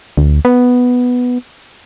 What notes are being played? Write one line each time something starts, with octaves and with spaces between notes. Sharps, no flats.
D2
B3